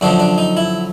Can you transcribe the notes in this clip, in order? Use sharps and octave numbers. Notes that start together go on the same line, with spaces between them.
F#2 D3 F3 D4
D4
D#4
E4